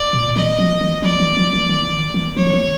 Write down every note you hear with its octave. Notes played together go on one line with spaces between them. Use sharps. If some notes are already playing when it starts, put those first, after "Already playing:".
Already playing: D5
A#2
E3 D#5
F3
E3
F3 D5
E3
F3
E3
D#3
E3
F3 C#5
D#3
E3